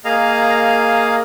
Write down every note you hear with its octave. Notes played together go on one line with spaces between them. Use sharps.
A#3 G#4 D#5 F5 A#5